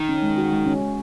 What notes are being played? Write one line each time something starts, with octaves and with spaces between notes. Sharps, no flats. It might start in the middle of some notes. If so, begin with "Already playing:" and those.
Already playing: D#3
C#4
G#3
F#4
G#3
C#4
G#3